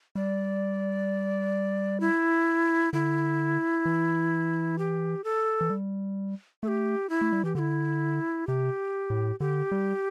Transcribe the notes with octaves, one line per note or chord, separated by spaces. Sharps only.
G3 D5
E4
D3 E4
E3
G4
A4
E3
G3
A3 A4
G4
E4
A3
G3
E3 G4
D3 E4 G4
C3 G4
A2
D3 G4
G3